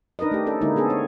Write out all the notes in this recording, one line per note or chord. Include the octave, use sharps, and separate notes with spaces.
D4 D#4 A#4 B4 D#5
A3 G4
C#4 A4 D5
D3 G#3 A#3 D#4 E4
B3 C4 G#4 A4
C#5